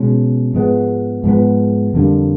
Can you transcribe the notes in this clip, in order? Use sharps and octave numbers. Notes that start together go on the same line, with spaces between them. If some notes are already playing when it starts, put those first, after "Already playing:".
Already playing: B2 G#3 C#4
G#2 F3 G#3 B3
G#2 F3 G#3 B3
F2 D3 G3 A#3